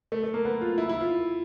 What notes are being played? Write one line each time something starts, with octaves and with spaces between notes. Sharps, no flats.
A3
A3
A#3
B3
F4
E4
E4
F4